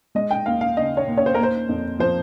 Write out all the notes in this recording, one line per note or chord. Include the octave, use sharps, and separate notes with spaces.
G#3 D#5
G5
D#2 F5
F5
C#3 D#5
C#5
D#2
C#5
C5
A#4
A#3 C5
F2
F3 C5